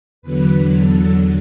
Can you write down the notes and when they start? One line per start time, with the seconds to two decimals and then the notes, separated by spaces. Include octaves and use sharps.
0.22 E2 D3 F#3 B4
0.75 A4